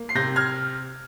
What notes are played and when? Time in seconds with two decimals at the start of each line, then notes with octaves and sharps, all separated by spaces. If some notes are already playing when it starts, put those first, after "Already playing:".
Already playing: A#3
0.09 C7
0.15 C3 G6 A#6
0.36 F6 G#6